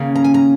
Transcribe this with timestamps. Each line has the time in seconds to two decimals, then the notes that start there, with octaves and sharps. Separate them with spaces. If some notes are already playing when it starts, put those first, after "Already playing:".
Already playing: D#2 C#3 A#3 C#4
0.16 A#5
0.24 G#5
0.34 A#5